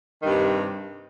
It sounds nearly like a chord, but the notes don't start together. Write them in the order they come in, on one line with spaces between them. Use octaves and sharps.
D#3 G2 C3